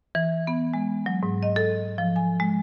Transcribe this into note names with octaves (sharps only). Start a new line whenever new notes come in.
E3
B3
G#3
F#3
G#2
D#5
A4
F3
G#5
G#3